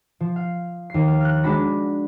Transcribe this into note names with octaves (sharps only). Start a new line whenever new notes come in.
F3
F5
D#2 C7
F5
F6 F#6
G#3 D4 F#4 B5 A#6 C#7